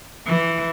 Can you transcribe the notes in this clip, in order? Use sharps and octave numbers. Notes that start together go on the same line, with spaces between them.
E3